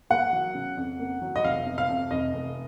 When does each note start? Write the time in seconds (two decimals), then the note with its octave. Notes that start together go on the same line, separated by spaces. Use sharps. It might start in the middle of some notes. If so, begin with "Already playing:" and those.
0.10 A#3 F#5
0.33 F#3
0.55 C#3
0.77 F2
0.99 A#3
1.22 F#3
1.36 D#5
1.44 F1 F5
1.67 C3
1.78 F5
1.89 F2
2.11 F1 D#5
2.34 F1